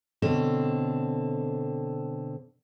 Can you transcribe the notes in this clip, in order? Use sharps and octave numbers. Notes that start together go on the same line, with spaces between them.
B2 D3 C4 A4 C#5